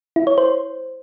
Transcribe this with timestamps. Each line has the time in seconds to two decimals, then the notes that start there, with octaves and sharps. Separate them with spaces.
0.16 E4
0.27 C#5
0.38 C5